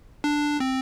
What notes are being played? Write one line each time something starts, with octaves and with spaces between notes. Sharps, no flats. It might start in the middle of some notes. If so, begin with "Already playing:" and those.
D4
C4